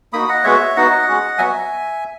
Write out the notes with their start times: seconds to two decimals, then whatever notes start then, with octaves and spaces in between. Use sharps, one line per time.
0.13 A#3 D#4 F#4 B5 D#6
0.29 D#5 F#5
0.44 G#3 B3 F#4 C#5 E5
0.76 B3 D#4 F#4 D#5 F#5
1.07 G#3 C#4 F#4
1.38 F#3 B3 F#4 E5 G#5